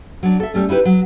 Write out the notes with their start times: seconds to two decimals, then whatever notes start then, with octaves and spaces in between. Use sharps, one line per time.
0.23 F#3 D4
0.40 A4 E5
0.54 G3 A3 C#4
0.69 D#4 E4 G4 B4
0.85 F#3